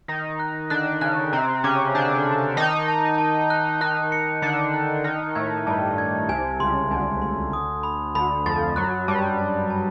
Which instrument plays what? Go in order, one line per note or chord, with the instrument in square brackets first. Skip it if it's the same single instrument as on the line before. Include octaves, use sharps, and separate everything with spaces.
[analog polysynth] D#3 D#4 [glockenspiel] A#6
[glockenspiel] F#6
[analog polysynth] D3 D4 [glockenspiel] F#6
[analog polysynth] C#3 C#4 [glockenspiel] F#6
[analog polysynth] C3 C4 [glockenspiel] A#5
[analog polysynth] C#3 C#4 [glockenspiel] D6
[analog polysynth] D3 D4 [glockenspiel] G6
[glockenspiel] D6
[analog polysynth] D#3 D#4 [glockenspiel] A5
[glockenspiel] A5
A5
F#6
[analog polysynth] D#3 D#4 [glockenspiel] F#6
[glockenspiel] C#7
[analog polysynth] D3 D4 [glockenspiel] C#7
[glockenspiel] F#6
[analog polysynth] D#3 D#4 [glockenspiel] F6
[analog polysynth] A2 A3 [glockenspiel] G#6
[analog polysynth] G2 G3 [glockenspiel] A5
[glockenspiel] G#6
[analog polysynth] C2 C3 [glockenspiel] G#5
[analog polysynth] C#2 C#3 [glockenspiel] C6
[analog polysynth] D2 D3 [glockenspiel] G#5
[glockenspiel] C6
D#6
B5
[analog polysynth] D2 D3 [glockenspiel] B5
[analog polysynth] F2 F3 [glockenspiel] A6
[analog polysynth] F#2 F#3 [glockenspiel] F#6
[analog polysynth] G2 G3 [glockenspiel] A5
[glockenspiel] A5
A5